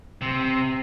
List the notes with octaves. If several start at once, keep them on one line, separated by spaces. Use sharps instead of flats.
C3